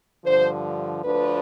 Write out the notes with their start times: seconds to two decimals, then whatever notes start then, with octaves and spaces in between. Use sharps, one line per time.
0.24 G2 D3 F3 C5
1.04 D2 D3 F3 B4